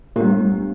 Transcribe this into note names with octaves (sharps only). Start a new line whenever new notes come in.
A#2 G3 B3 D4 G4
A2
G2